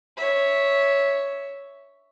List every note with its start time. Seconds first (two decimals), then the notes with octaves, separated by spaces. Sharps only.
0.17 C#5 E5